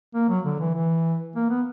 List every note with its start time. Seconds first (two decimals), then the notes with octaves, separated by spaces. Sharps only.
0.14 A#3
0.29 F#3
0.45 D3
0.60 E3
0.74 E3
1.36 A#3
1.50 B3